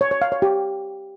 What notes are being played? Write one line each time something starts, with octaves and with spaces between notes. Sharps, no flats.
C#5
C#5
F5
C#5
G4